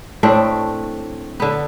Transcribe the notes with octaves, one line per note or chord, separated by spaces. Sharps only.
A2 A3 C4 D4
D3 B3